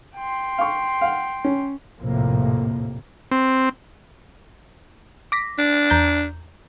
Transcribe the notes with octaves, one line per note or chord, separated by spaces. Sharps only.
G5 C6
F5 C#6
F5 F#5
C#4
A#1 F2 A2 C3 A#3
C4
D6 A#6 B6
D4
E2 A#5 G6